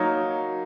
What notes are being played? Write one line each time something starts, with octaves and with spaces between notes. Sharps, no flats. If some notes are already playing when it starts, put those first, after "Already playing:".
Already playing: F#3 A#3 D#4 A#4 C#5